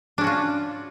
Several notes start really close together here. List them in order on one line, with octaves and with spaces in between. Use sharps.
D4 C#4 F#4 F4